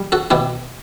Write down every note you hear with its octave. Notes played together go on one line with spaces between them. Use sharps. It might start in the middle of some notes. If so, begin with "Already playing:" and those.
Already playing: G3
F#4 A4
B2 E4 G4